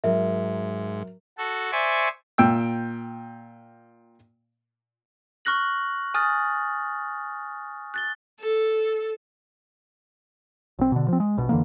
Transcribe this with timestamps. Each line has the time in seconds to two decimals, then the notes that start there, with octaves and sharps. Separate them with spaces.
0.04 G#2 F#3 A#4 E5
1.38 F#4 A4
1.72 C5 D5 E5 G#5 C#6
2.38 A#2 G5 E6
5.45 C#6 F6 F#6 A#6 F#7
6.14 G#5 D#6 F6 F#6 A6
7.94 F#6 A6 G7
8.40 A4
10.79 B1 C4
10.92 B2 D3
11.08 F3 C4
11.20 G#3
11.37 A#1 B2
11.49 F2 D3 E3 A#3